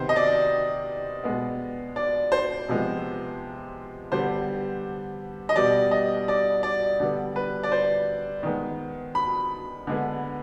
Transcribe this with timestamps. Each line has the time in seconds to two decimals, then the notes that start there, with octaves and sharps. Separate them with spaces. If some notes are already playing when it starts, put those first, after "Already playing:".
Already playing: C3 D#3 B3 C5
0.09 D#5
0.16 D5
1.24 B2 G#3 B3
1.96 D5
2.32 C5
2.68 C3 F3 G#3 B3
4.12 D3 G3 B3 C5
5.49 D#5
5.56 B2 G3 B3 D5
5.91 D#5
6.28 D5
6.63 D5
7.00 D3 G3 B3
7.36 B4
7.63 D5
7.72 C5
8.43 D#3 G#3 B3
9.15 B5
9.87 D3 G#3 B3